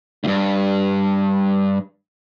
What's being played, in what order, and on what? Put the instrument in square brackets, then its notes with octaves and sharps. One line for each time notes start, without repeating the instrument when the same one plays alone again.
[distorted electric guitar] D2 G2